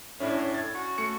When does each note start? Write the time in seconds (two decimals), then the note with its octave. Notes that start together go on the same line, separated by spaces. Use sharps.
0.20 A2 C#4 D4 E4
0.54 G#6 A6
0.75 C#4 F#4
0.98 A3 C#6 C#7